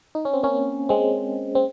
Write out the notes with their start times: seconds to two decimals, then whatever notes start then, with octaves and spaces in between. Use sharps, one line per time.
0.15 D#4
0.25 C#4
0.33 C4
0.43 A#3 C#4
0.89 G#3 C4
1.55 C4